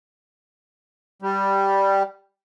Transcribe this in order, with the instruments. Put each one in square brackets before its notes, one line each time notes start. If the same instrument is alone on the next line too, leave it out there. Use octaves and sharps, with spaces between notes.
[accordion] G3